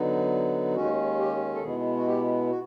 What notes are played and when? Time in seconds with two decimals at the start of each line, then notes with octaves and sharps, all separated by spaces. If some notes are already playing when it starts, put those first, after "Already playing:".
Already playing: D3 F#3 B3 D#4
0.75 D#2 D#3 G#3 C#4 F#4
1.19 G4
1.55 A4
1.63 B2 G#3 B3 E4 G#4
1.97 F#4
2.08 G4
2.51 F#4